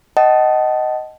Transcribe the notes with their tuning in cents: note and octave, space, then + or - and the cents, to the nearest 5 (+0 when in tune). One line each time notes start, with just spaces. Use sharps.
D#5 +0 F#5 +40 A5 -20